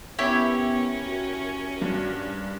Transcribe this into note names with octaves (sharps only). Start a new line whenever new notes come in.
B3 C#4 E4 G4 A#4 C#5
F#4
G2